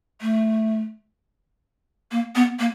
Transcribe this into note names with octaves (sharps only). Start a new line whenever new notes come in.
A3
A#3
B3
A#3